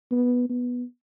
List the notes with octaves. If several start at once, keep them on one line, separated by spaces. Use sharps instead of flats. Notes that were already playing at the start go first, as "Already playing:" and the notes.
B3
B3